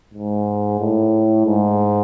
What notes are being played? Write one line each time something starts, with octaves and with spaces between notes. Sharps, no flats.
G#2
A2
G#2